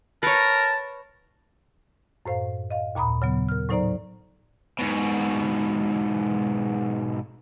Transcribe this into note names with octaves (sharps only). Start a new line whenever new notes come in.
A#4 B4 C#5 A5
F#2 A2 C5 F5
D#5 F5
D#2 A#2 A#5 B5 D#6
C#3 F#3 B3
A#4 F6
A2 F#3 D#4 C5 D5 A#5
G#2 B2